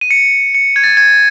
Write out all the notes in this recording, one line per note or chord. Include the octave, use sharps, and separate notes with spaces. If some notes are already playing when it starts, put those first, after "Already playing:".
D#7
C#7
C#7
G#6
A6
G#6